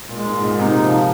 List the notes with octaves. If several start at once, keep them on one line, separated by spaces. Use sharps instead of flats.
A#2
G#3
G#2
G#2
A#2
C3 D#4
F3